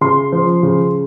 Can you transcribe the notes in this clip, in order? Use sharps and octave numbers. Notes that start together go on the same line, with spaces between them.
C#3 C6
F3
C#3